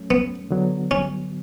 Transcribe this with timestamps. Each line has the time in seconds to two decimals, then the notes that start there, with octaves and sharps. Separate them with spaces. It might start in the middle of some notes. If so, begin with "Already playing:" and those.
Already playing: F#3 A3 C#4
0.11 B3
0.50 D3 F#3 B3
0.91 C#4